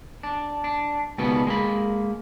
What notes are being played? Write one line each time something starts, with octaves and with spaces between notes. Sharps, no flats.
D4
D4
C#2 B2 D#3 G3 B3
G#3 A#3 B5